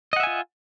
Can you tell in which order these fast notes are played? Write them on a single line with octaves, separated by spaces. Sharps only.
D#5 F#5 E5 G#5 F4